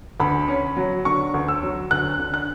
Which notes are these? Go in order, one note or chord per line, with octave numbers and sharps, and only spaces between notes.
D2 B5
C#4
F#3
D3 C#6
D2
E6
F#3
D2 F#6
D3
F#6